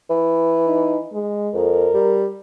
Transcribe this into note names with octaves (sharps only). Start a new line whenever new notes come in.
E3
D#4
G#3
F2 A#4
G3